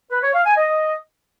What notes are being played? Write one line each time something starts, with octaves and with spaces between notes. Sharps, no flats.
B4
C#5
F5
G#5
D#5